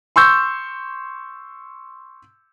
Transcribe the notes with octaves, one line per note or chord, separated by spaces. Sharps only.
C6 C#6 E6 G6